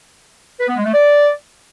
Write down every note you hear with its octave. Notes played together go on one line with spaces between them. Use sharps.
B4
B3
G#3
A3
D5